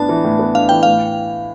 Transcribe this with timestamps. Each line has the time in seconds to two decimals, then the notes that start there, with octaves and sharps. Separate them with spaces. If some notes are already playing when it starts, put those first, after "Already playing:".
Already playing: A2 B3 D4 A5
0.09 E3
0.24 A2
0.39 B3
0.55 D4 F5
0.69 E3 G5
0.83 A2 F5